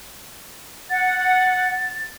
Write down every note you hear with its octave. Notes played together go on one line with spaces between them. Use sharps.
F#5 A6